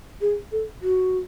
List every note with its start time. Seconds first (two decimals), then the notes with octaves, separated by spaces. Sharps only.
0.21 G#4
0.52 A4
0.82 F#4